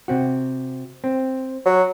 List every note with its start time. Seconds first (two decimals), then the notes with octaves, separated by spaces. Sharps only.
0.08 C3 C4 F#4
1.04 C4
1.65 F#3